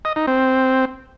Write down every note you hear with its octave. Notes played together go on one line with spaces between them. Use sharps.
D#5
D#4
C4